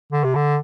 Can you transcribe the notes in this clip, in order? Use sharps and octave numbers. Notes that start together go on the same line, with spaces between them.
D3
C3
D3